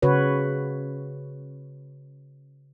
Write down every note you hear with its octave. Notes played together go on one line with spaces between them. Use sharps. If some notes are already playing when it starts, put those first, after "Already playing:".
C#3 F#4 B4 C#5